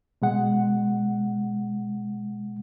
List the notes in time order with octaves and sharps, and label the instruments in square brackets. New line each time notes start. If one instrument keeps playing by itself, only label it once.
[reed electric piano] B2 G#3 F#5